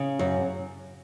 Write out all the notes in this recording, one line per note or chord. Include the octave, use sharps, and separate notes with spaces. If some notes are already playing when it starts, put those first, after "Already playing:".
Already playing: C#3
F#2